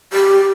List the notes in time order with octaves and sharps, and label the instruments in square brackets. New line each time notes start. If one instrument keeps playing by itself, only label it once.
[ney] G4